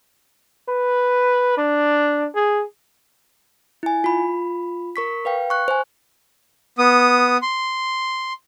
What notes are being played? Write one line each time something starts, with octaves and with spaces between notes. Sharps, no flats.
B4
D4
G#4
E4 G#5
F4 B5
A#4 C#6 B6
B4 F5 G5
C#6 F#6
C5 G#5
B3 D#6
C6